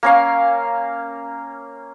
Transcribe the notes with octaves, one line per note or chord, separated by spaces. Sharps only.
A#3 C#4 F5